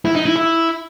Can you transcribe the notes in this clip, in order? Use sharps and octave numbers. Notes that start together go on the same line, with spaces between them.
E4
D#4
E4
E4